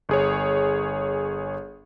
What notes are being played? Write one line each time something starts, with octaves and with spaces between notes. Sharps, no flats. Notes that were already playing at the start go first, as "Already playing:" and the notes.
G1 G#4 C#5